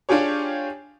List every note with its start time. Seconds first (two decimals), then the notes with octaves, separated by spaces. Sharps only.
0.09 D4 F4 G4 G#4 C#5